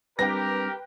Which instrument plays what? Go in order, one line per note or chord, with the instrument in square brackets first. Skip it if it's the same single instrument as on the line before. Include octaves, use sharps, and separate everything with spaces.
[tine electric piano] G3 C4 D4 [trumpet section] G4 A#4 [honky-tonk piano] B4 G5 [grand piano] A#6